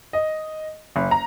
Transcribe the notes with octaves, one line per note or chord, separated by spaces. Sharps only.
D#5
F#1
A#5